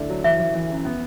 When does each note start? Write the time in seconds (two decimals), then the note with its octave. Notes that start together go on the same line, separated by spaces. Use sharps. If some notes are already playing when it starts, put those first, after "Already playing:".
Already playing: D3 A3 D4 E4
0.10 F#3
0.24 E3 E5
0.40 E3
0.55 E3
0.70 F#2
0.85 B3